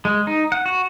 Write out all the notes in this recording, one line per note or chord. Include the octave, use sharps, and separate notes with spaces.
G#3
D#4
F#5
F#4